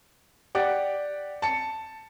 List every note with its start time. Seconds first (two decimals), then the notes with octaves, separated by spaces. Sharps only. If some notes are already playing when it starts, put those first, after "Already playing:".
0.55 G4 D5 F#5
1.42 A5 C#7